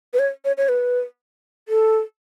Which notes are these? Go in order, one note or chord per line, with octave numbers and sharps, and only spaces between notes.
B4
C#5
C#5
C#5
B4
A4